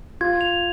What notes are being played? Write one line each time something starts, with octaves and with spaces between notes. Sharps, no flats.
F4 G#6
F7